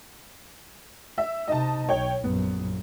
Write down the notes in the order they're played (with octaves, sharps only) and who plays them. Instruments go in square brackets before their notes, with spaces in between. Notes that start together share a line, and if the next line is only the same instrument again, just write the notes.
[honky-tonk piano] E5
[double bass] C3 D#4 [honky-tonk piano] D#5 A5
[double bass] B1 [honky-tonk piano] C#5 G5
[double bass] A#1 F#2 [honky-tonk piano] B3